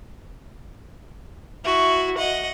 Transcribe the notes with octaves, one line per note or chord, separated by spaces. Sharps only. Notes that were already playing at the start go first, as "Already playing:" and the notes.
E4 F#4
D#5 F#5